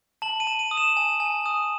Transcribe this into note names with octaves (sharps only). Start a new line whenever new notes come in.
A5 F#7
D#7
A5
D#7
D#6
E7
G#5
G#5
D#6